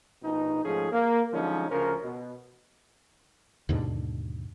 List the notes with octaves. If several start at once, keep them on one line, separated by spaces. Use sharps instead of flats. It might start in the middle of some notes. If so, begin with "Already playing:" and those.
A#1 B2 D#4
G#2 F3 A3 C#4 G#4
A#3
D3 F3 F#3 G#3 C#4 D#4
D2 C#3 F3 C#4 A#4
B2
D#2 G#2 B2 D3